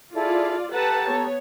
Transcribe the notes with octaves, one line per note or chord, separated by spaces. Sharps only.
E4 F4 G#4 A4 D5
G4 A4 B4 F#5 A5 A#5
B3 C#5